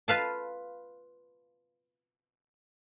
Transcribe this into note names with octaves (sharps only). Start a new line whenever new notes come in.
F4 B4 F5 A5